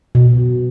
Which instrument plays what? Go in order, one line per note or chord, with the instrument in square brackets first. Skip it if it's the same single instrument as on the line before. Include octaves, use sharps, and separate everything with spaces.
[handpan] B2